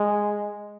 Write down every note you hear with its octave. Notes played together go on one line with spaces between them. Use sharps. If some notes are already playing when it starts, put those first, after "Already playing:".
Already playing: G#3